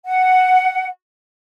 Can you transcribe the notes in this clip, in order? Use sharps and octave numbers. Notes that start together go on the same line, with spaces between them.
F#5